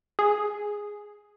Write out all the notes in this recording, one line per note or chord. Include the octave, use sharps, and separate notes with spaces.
G#4